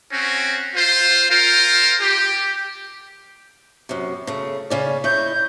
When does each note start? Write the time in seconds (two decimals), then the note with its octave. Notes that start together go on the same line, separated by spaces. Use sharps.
0.12 C4 C#4 F#4
0.76 F4 C5
1.30 F4 A#4 C5
2.01 G4
3.89 F#2 C3
4.27 C#3 A3
4.70 C#3 C#4 D5
5.04 E4 C#5 D#5 G6